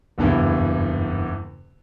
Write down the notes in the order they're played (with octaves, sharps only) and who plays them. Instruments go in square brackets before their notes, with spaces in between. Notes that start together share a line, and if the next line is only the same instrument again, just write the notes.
[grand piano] F#1 E2 G2 E3